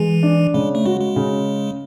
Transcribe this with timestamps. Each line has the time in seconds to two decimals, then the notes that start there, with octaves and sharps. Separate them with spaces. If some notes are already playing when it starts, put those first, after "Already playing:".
Already playing: E3 G#3
0.23 D4
0.54 C#3 G#3
0.75 A3
0.85 G#3 F#4
1.01 G#3
1.16 C#3